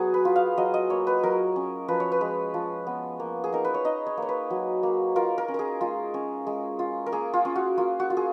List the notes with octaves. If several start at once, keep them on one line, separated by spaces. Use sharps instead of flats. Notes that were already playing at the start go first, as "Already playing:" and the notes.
Already playing: F#3 B3 F#4 G#4
B4
F4
F5
F#3 D#5
D#5
A#3 C#5
B4
F#3 A#4
C#4
F3 B4
C#5
B4
G#3
F3
B3
A#3
G#4
D#4 A#4
B4
C#5
D#4 D#5
C#5
A#3 C#5
B4
F#3
A#3
F4 A#4
A#4
C#4
G#4 A#4
G#3 F4
C#4
G#3
F4
A#4
A#3 G#4
F4
C#4
F#4
A#3 F4
F#4
F4
G#4